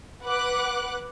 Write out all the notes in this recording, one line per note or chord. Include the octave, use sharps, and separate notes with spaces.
B4 F#5 D6 F#6